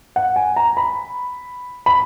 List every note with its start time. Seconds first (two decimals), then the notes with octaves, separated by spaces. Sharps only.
0.16 F#5
0.36 G#5
0.56 A#5
0.77 B5
1.86 B5